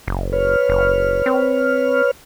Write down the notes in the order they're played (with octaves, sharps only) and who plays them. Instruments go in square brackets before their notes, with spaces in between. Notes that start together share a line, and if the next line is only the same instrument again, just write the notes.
[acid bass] F#1
[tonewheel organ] B4 C#5 F6
[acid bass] F#1
C4